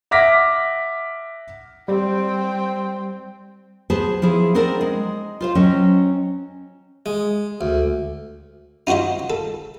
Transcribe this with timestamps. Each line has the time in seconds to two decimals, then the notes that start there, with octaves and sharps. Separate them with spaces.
0.11 E5 F#5 D6 F6 A#6 B6
1.88 G3 C4 G5
3.90 B3 G#4 C5 A5
4.22 F3 E4 G#4
4.55 B3 C4 D4 A#4 C5 D5
4.81 G#3
5.41 F4 C5 F5
5.55 F#3 C#4 C5 D#5 G5
7.06 G#3
7.61 D2
8.87 D#4 F4 F#4 C5 D#5
9.30 A4